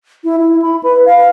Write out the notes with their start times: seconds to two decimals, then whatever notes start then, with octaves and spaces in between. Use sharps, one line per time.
0.24 E4
0.39 E4
0.62 B5
0.83 B4
1.06 F5